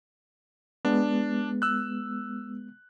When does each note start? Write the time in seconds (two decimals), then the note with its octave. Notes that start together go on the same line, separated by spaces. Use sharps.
0.85 G#3 B3 D4
1.62 E6 F#6